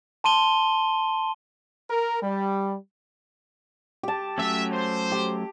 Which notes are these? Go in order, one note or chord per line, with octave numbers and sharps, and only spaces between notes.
A5 C6 D#7 G7
A#4
G3
G4 A5
F#3 A3 C#4 E5
C5
G4